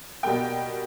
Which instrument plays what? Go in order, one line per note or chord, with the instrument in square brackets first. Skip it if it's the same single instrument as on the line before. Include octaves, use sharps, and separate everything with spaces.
[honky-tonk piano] B2 G3 A#3 G5